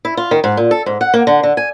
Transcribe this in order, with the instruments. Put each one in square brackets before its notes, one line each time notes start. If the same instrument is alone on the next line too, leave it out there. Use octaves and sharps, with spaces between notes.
[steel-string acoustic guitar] E4
F4
D#3
G#2
A#2
A4
G#2
F#5
A#3
D3
D3
G#5